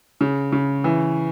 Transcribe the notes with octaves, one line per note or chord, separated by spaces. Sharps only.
C#3
C#3
E3